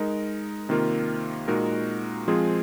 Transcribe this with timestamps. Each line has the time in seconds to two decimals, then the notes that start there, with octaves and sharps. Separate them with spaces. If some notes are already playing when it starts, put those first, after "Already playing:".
Already playing: G#3 D#4 A#4
0.69 C3 D#3 A#3 F4 A#4
1.48 A#2 G#3 D#4 F#4 A#4
2.28 F3 G#3 C4 F4 G#4